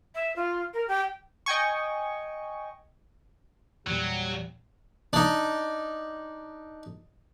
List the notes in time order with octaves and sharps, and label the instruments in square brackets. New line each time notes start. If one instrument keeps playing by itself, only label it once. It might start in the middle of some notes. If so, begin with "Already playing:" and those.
[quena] E5
F4
A#4
G4
[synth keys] D#5 G5 G#5 C#6
[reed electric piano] E2 A#2 [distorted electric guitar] F#3 [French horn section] G3
[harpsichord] D4 D#4